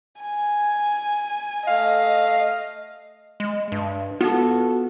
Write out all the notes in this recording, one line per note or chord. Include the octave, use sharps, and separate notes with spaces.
G#5
A3 D#5 F5
G#3
G2
B3 F4 F#4 A4